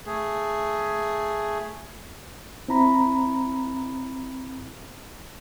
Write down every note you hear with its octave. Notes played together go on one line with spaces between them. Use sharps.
A3 G#4
C4 E4 A#5 B5